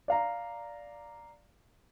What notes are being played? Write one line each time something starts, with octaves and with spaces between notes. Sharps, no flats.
D5 F5 A#5